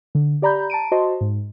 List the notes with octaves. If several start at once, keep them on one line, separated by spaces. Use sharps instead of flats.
D3
G4 D5 A#5 B5 G6
A5 A#5 D7 D#7
F#4 C5 D#5 A5 C6
G#2